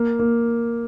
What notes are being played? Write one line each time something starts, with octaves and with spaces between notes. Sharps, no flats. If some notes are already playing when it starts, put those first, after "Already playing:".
Already playing: A#3
A#3